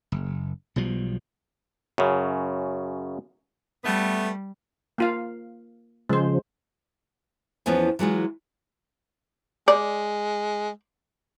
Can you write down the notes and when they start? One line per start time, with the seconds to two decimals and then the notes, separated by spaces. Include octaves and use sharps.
0.12 F#1
0.76 B1 B2 F3 G3
1.98 F#2 C#3
3.84 G3 A3 B3
4.98 A#3 F4 F5
6.09 C#3 F3 G#3 C5
7.66 E2 E3 F3 B3 C#4
7.99 E3 F#3 G#3 F4
9.68 G#3 D5